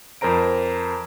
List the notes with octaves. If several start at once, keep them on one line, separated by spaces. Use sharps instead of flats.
F2 A#4 C5 A#5 D7